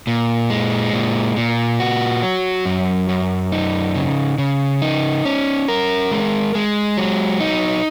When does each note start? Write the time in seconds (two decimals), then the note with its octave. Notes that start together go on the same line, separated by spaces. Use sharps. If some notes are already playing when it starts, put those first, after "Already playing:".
0.07 A#2
0.50 G#3
0.93 A#2
1.36 A#2
1.80 F#4
2.23 F#3
2.66 F#2
3.09 F#2
3.52 D#4
3.95 C#3
4.38 C#3
4.82 D#4
5.25 C#4
5.68 A#4
6.11 G#3
6.55 G#3
6.97 F#3
7.40 D#4